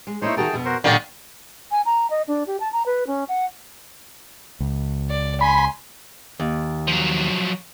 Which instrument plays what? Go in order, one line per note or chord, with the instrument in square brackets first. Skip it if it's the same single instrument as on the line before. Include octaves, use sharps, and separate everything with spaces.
[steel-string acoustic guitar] G#3
[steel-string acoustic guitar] A3 A#3 E4 [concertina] D#4 C5 C#5
[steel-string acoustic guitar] D#3 F#4 A#4 [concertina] G#4 G5 A5
[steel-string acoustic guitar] F2 B2 B3
[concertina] F#4 A#4 C5
[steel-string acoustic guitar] A#2 F#3 D#4 [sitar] D3 D#3 [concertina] G4 D5 F5
[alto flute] G#5
A#5
D#5
D4
G4
A5
A#5
B4
C#4
F#5
[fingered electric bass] C#2
[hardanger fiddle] D5
[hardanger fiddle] G#5 C6 [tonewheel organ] B5
[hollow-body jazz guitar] D#2
[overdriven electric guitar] F3 F#3